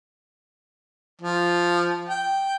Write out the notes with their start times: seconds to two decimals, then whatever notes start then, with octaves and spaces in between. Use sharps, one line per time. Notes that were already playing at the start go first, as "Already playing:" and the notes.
1.22 F3
2.09 G5